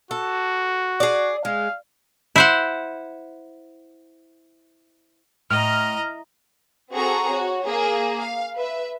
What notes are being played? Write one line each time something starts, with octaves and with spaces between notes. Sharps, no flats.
F#4 A4
G#4 D5
G#3 F5
E4 C5 F#5
A2 D#5 A#5 F6
C4 F#4 G#4 A4 A#5 C#6
F#4 C#5
A#3 G#4
F5
B4 E5